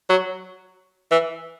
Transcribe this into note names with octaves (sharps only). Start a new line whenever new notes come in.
F#3
E3